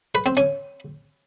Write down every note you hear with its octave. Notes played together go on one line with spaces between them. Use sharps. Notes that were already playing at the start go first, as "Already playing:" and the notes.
B4
C4
C#4